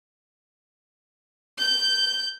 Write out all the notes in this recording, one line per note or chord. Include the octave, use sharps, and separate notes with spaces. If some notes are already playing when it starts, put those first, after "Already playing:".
G6